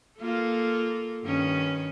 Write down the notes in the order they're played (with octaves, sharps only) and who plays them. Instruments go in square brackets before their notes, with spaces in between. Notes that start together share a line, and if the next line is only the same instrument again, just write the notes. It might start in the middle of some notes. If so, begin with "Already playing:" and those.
[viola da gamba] A#3 F4 A4
G2 D#3 C#4